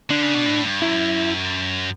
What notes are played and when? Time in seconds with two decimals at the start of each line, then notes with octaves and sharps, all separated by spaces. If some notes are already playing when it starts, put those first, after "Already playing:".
0.10 D3 D4
0.22 C#3
0.34 B2
0.46 A2
0.65 G2
0.82 F#2 E4